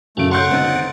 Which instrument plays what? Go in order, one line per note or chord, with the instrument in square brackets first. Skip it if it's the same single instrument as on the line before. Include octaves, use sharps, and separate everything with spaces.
[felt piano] F#2 C#3 D7 [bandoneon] A3 [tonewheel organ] C#4 D4
[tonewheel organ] A4 C#5 [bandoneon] F#5 [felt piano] C6 G6
[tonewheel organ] D3 [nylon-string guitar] C4 D#4